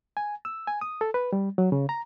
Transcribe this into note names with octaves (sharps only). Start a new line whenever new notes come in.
G#5
E6
G#5
D#6
A4
B4
G3
F#3
C#3
A#5